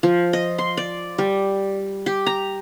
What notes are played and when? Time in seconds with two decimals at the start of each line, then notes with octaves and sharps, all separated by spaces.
0.03 F3
0.33 D#5
0.58 C6
0.77 D5
1.18 G3
2.06 G4
2.26 A#5